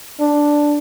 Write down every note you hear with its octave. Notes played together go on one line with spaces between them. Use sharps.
D4